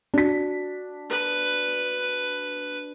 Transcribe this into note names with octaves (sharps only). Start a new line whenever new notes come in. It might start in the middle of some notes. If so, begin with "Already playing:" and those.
D4 F#4 B6
B4